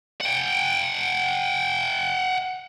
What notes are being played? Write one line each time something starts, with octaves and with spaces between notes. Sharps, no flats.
F#5 G5